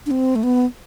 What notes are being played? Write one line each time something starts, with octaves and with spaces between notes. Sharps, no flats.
D4
C4
A3
B3